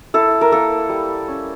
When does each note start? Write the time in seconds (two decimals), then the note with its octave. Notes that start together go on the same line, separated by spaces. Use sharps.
0.14 E4 A4
0.41 A#4
0.52 A#3 A4
0.89 G3
1.28 C#4